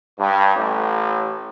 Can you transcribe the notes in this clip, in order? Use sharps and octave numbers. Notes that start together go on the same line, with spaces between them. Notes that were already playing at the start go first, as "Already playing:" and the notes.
G2
A1 A2